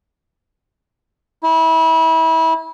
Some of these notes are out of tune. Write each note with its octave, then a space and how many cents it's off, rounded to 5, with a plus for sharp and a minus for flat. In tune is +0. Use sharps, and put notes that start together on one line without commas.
E4 -30